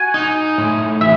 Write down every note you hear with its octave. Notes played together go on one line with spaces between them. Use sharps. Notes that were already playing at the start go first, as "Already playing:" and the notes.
Already playing: F#4 G#5
D#4
A2
E3 E5